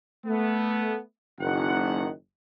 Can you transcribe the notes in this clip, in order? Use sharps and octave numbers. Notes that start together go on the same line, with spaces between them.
A3 B3
F#1 D#3 F#5